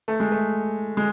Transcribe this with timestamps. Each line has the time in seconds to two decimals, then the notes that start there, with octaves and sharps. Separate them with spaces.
0.08 A3
0.20 G#3
0.32 A3
0.97 G#3